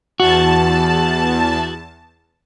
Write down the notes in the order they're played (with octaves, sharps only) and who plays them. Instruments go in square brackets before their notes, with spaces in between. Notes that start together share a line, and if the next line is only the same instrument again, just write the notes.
[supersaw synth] E2 A5 [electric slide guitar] F#4